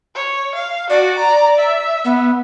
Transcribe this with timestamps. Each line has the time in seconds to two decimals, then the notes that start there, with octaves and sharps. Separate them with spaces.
0.15 C#5
0.55 F5
0.90 F#4 D5
1.19 A#5
1.58 E5
2.05 B3